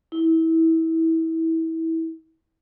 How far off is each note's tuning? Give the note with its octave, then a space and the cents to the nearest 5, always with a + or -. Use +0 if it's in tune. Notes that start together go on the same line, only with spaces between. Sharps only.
E4 -25